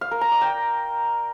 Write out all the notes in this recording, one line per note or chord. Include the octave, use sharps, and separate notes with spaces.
F5
A#4
A#5
D5
G5